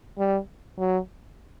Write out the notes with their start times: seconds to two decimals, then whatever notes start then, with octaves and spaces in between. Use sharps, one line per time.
0.18 G3
0.79 F#3